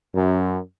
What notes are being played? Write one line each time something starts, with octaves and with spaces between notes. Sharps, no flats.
F#2